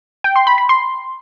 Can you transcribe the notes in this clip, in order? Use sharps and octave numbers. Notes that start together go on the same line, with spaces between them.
G5
C6
B5
B5
C6